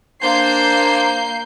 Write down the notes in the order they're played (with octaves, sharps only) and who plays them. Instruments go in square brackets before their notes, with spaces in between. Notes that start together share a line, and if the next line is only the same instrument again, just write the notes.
[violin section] A#3 G6 C7 [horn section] D4 C5